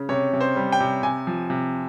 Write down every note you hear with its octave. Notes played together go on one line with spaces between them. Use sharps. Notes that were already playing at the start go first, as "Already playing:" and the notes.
Already playing: C#3
C3 C#5
C3
C5
G3
G5
C3
C3 G#5
F3
C3